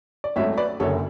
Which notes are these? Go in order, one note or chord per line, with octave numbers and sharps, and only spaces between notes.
D5
G#1 G#2 F#3 A3 C#5 E5
B4 D5
F#1 F#2 D3 A4 C#5